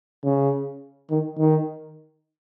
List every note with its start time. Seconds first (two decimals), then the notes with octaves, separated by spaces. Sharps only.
0.24 C#3
1.11 D#3
1.39 D#3